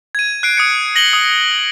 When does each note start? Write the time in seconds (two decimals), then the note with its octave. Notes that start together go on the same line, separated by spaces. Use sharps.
0.15 G#6 D#7
0.43 F#6 C7 D7
0.57 D#6 G#6 C#7
0.96 A#6 F#7 G7
1.13 D#6